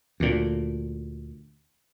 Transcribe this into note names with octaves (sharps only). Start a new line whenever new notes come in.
D2 A#2